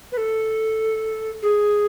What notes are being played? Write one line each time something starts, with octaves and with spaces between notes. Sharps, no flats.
B4
A4
G#4